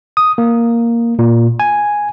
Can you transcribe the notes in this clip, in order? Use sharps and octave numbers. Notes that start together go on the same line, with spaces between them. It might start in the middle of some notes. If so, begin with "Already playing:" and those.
D#6
A#3
A#2
G#5